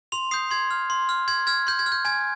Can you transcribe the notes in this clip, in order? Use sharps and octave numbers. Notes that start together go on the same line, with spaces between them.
C6 F7
D#6 G6 C7
C6 G#6
F6
C6
F6
C6 G#6
F6 G#6
C6 G6
G#6
F6
G6
G#5 G#6